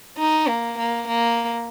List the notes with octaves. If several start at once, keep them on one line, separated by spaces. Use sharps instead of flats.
D#4
A#3
A#3
A#3